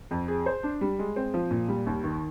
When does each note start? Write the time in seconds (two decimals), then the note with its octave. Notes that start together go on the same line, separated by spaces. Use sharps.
0.11 F2
0.28 G#4
0.46 C5
0.63 D4
0.81 G3
0.99 G#3
1.16 C4
1.34 F3
1.51 A#2
1.68 G3
1.86 D#2
2.04 D#3